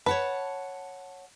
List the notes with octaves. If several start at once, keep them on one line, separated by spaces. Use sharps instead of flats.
B4 C#5 F#5 A5